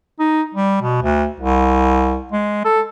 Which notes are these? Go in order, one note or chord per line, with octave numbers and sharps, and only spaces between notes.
D#4
G3
B2
D2
C2
G#3
A4